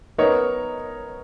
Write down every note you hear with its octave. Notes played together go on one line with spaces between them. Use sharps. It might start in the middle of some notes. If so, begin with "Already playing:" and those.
B3 D#4 A#4 C#5